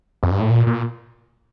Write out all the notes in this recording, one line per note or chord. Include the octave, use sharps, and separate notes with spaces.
F2
G2
A2
A#2
A#2